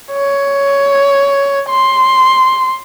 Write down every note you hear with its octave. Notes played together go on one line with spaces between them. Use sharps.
C#5
C6